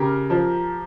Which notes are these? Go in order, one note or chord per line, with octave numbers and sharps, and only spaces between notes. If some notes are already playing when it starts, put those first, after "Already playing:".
Already playing: C#3 G4 A#4
F3